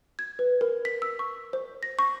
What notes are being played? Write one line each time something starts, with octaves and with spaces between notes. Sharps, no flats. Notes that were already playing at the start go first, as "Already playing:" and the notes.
G#6
B4
A#4
B6
E6
C#6
C5
A#6
C#6